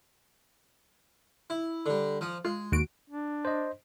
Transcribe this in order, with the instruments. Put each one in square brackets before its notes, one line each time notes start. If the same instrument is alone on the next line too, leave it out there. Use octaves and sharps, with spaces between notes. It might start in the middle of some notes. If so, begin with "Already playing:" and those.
[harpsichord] E4
D3 G3
F3 D#6
[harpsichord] G#3 [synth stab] F4
[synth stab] D#2 F#4 D7
[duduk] D4
[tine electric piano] C5 D#5